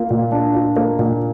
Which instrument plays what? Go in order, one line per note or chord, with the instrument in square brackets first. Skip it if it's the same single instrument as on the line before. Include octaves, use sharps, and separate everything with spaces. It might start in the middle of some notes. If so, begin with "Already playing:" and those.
Already playing: [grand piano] A#3 F4
A#2
D4
F4
A#3
A#2